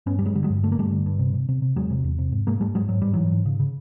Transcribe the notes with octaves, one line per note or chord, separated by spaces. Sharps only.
G2 B3 C#4
G3
G2 F#3 G#3
D3 G3
F#3 G#3
G2
D3 A3
A#3
G2 G3 A3
D3
G2
C3
C3
C3
C3
E2 F#3 G#3
C3
E2
C3
G#2
G#2 G#3 A#3
G#2 G3 A3
G#2 F#3 G#3
G#2 F#3
G#2 G3
G#2 E3 F#3
G#2
C#3
C#3